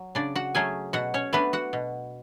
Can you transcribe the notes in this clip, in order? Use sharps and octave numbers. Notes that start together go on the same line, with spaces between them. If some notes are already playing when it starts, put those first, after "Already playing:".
Already playing: F#3
C#3 D4 D5
F#4 F#5
F#3 A3 C#4 G#4 G#5
B2 F#4 F#5
C#4 C#5
A3 B3 D4 B4
F#4 F#5
B2